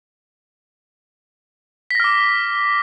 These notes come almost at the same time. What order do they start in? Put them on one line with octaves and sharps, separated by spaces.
B6 A#6 F6 D6